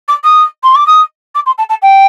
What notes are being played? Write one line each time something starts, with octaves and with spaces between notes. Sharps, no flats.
D6
D#6
C6
D6
D#6
D6
C6
A5
A5
G5